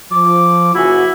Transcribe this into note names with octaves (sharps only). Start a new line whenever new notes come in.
F3 D6
F#1 E4 F#4 G#5